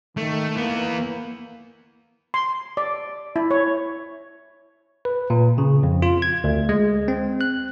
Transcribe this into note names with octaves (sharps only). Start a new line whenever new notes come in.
D#3 A3
E3 A#3 B3
C6
D5
E4
C#5
B4
A#2
C#3
F2
F4
G#6
D2
G#3
C4
F#6